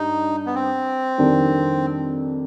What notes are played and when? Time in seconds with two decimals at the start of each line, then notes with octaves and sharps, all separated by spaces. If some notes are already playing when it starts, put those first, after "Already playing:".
Already playing: G2 D#4
0.46 B3
0.55 C4
1.18 F2 D#3 G3 D4